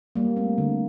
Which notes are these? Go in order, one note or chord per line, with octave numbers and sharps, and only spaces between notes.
G3 A#3
A3 C4
D3